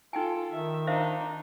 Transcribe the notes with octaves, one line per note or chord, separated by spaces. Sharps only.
D#4 F4 A4 G5 G#5
D#3 E5
D4 D#4 C5 E5 F5